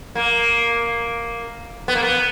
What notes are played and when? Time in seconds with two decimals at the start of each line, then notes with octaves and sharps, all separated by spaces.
0.15 A#3
1.88 B3
1.95 A#3
2.03 B3